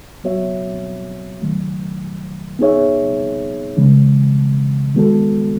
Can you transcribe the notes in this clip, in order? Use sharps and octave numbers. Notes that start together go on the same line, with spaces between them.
F#3 B3 F#4 C#5 E5
D#3 F#3 A3
B3 D#4 G#4 C#5 E5
C#3 E3 G#3 C#4
D#3 G#3 B3 F#4 A4